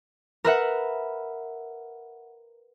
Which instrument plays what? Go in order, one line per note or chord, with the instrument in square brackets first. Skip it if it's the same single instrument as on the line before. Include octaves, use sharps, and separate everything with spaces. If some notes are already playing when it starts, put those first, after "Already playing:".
[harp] A#4 B4 E5 F#5